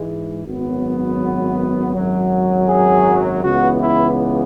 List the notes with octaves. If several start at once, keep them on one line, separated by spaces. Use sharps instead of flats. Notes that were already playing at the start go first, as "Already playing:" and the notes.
Already playing: G#2 E3 G#3
G#1 F#2 F#3 B3
G#1 F#2 F#3
G#4
C#2 C#3 E3 B3 F#4
E4